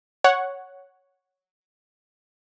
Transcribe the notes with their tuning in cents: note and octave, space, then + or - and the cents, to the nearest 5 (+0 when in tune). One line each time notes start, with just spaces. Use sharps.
C#5 +0 F#5 +0